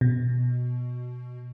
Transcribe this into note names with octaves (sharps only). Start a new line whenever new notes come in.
B2